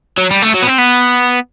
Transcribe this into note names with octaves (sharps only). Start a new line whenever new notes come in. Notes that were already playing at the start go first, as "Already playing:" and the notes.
F#3
G3
A3
F#3
B3
C4
B3